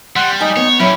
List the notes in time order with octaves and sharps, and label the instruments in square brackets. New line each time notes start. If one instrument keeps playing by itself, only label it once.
[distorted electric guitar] G3 [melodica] F#5 C6
[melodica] D#4 [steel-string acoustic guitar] G#5
[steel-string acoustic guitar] B3 [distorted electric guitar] C#5
[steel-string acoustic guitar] F#3 C#5 [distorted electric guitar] C#4 G4 [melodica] E4